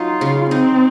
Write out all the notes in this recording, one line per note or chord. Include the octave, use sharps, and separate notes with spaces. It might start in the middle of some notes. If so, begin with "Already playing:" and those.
Already playing: F#3 D#4 F4
C#3
C4 D#4